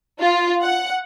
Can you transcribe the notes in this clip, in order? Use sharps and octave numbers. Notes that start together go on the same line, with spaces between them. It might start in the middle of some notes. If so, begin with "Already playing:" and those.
F4
F#5